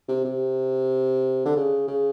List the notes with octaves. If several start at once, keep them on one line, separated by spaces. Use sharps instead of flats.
C3
C3
D3
C#3
C#3